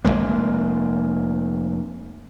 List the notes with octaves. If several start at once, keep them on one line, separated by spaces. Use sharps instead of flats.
F1 F2 G#3 A#3